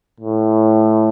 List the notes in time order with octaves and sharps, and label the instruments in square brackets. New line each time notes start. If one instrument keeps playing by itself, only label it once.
[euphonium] A2